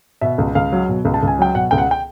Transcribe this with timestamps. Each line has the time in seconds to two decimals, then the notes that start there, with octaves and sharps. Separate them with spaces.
0.21 B2 E5
0.38 C#2
0.55 C#2 F5
0.72 F#3
0.89 B2
1.05 C#2
1.14 A5
1.23 C#2 G#5
1.39 F#3 G5
1.55 B2 F#5
1.71 C#2 G5
1.78 F#5
1.91 G5